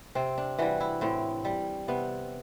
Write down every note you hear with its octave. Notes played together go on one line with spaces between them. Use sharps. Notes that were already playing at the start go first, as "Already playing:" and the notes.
C3 C4
D4
E3 G3 F#4
E4
A2 C4
G3
C3 B3